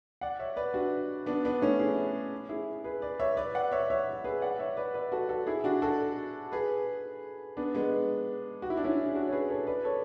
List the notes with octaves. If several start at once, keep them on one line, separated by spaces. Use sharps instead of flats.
D5 F#5
C#5 E5
B4 D5
D4 F#4
B3 D4
B3 D4
A3 C#4
E4 G#4
E4 G#4
G#4 B4
B4 D5
C#5 E5
B4 D5
D5 F#5
C#5 E5
C#5 E5
G#4 B4
D5 F#5
C#5 E5
B4 D5
B4 D5
F#4 A4
F#4 A4
E4 G#4
D4 F#4
F#4 A4
G#4 B4
B3 D4
G#3 B3
F#4
E4
D4
C#4 E4
G#4
D4 F#4
C#5
G#4 B4
A4 C#5
B4 D5
A4 C#5